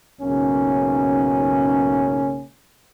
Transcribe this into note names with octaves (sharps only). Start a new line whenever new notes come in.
B1 G#2 C#3 A#3 C#4